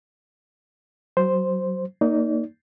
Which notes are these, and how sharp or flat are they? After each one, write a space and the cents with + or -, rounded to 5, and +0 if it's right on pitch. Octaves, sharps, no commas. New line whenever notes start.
F#3 +20 C5 +0
A#3 +0 D#4 +0 D5 -35